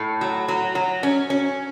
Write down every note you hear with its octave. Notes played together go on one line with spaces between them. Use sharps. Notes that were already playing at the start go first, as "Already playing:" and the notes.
Already playing: A2
F#3
F#3
F#3
C#4
C#4